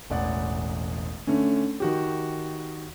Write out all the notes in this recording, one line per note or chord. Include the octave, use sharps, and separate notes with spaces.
E1 A1 D5 F#5
D3 A3 C#4
D#3 F#4 G4